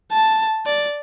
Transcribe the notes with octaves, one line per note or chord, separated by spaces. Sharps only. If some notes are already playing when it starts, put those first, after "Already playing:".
A5
D5